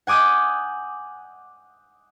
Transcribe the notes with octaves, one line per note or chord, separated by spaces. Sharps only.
F#5 G#5 D6 D#6 G6